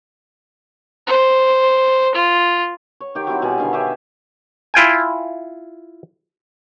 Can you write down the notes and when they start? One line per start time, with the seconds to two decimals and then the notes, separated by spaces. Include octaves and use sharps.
1.07 C5
2.15 F4
3.01 C#5
3.15 D#3 G4 G5
3.27 F#3 G3 C4 E4
3.42 B2 G3 G#4
3.58 D3 D#3 F5 G#5
3.73 G4 G#4 C#5 E5
4.74 E4 F4 G5 G#5